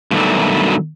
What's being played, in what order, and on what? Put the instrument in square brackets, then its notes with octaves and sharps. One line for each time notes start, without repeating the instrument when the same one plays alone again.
[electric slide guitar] G2 B2 D3 D#3 F#3 A3